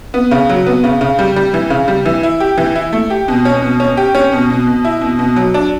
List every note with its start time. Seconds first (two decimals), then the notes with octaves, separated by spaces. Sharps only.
0.14 B3
0.31 C#3
0.49 F#3
0.66 B3
0.84 C#3
1.01 C#3
1.19 G3
1.36 G3
1.54 E3
1.70 C#3
1.88 G3
2.06 E3
2.23 E4
2.40 G4
2.58 E3
2.75 E4
2.93 A3
3.10 G4
3.28 B2
3.45 C#4
3.62 B2
3.80 C#4
3.97 G4
4.15 C#4
4.32 B2
4.50 B2
4.67 B2
4.85 E4
5.01 B2
5.19 B2
5.36 F#3
5.54 D4